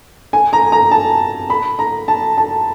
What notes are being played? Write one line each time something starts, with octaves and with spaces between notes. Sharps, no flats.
G#5
A#5
A#5
A5
B5
A#5
A5
A5